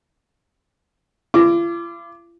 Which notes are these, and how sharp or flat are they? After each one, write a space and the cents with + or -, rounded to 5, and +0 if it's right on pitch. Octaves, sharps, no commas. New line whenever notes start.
F4 -45 D6 +0